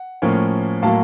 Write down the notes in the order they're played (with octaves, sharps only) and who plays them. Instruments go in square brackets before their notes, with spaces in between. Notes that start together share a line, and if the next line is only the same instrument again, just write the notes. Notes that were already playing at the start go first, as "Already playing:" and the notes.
Already playing: [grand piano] F#5
A2 F3 A#3 C#4
A2 F#3 A#3 F5 A5